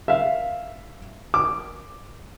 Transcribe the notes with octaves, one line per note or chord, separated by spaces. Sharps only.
E5 F5
D6